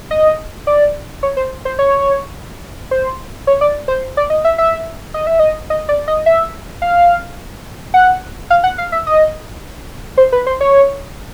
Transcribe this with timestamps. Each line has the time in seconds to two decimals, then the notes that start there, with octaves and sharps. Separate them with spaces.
0.11 D#5
0.67 D5
1.23 C#5
1.37 C5
1.65 C5
1.79 C#5
2.91 C5
3.47 C#5
3.61 D5
3.88 C5
4.17 D5
4.30 D#5
4.45 E5
4.58 E5
5.14 D#5
5.27 E5
5.39 D#5
5.70 D#5
5.89 D5
6.08 D#5
6.26 E5
6.82 F5
7.94 F#5
8.50 F5
8.64 F#5
8.78 F5
8.92 E5
9.07 D#5
10.17 C5
10.32 B4
10.47 C5
10.61 C#5